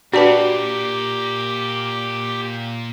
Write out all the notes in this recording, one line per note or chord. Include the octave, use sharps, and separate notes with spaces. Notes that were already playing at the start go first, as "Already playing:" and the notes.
A#2 D4 F#4 G4 B4 D5 A5